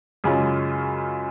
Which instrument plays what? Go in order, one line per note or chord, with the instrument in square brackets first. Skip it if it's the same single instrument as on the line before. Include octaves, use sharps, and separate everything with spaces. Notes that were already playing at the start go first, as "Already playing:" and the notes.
[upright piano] F#2 C#3 G#3 C#4 F4